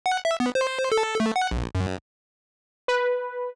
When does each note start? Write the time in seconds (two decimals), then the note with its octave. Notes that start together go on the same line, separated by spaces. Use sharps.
0.06 F#5
0.25 E5
0.40 B3
0.55 C5
0.92 A4
1.20 A3
1.36 F#5
1.51 A#1
1.75 F#2
2.88 B4